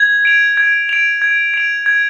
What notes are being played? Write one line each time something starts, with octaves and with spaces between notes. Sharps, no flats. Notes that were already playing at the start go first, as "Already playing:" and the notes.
Already playing: G#6
D7 F7
G#6
D7 F7
G#6
D7 F7
G#6